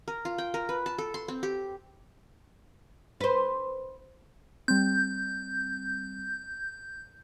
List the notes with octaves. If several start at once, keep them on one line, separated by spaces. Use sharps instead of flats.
A#4
F4
G5
A#4
B4
A5
A4
C6
C4
G4
B4 C5
G3 C4 G6